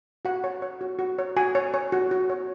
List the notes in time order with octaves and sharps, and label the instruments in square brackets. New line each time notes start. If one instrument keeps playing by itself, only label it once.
[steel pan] F#4 F#5
C#5
C#5
F#4
F#4
C#5
F#4 G#5
C#5
C#5
F#4
F#4
C#5